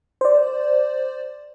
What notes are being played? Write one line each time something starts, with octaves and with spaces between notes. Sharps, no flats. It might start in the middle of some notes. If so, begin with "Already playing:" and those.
C5 D5